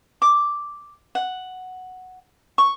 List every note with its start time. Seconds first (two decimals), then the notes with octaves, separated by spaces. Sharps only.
0.22 D6
1.15 F#5
2.58 C#6